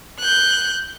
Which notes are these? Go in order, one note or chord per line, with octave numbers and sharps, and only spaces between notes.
F#6 G6